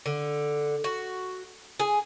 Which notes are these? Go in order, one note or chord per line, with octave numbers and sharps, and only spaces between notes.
D3
F#4
G#4